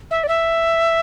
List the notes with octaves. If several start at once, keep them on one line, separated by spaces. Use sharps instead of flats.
E5
D5
E5